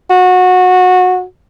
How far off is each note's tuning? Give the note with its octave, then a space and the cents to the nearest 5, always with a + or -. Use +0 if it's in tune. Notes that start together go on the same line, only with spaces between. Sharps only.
F#4 -20